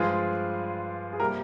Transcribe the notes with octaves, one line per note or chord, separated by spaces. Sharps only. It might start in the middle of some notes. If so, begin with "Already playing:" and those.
Already playing: G2 F3 G#3 F4 G#4
G#4
C3 G3 A#3 G4 A#4